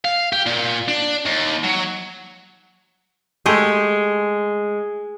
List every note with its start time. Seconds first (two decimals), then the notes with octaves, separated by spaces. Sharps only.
0.05 F5
0.33 G4
0.46 A#2
0.88 D4
1.25 D#2
1.64 F#3
3.46 G#3 A3 G4 G#4